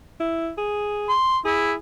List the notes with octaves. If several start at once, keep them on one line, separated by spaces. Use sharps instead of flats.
E4
G#4
C6
E4 G#4